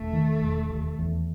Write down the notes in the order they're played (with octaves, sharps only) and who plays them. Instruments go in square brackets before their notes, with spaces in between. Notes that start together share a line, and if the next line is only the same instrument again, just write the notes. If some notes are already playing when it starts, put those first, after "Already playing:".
Already playing: [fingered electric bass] E1 [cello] A3
[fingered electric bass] D#3
E1
D#2
E2